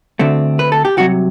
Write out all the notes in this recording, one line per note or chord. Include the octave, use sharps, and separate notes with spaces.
D2 D3 A3 C4
B4
A4
G4
C2 C3 F#3 F#4